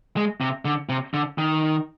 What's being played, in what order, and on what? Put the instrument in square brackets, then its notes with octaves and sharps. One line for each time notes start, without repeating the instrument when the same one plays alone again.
[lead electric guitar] G#3
C3
D3
C3
D3
D#3